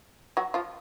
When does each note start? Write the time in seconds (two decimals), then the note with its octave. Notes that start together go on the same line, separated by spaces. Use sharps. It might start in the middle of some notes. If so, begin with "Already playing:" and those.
0.37 F#3 F#4
0.54 F3 F4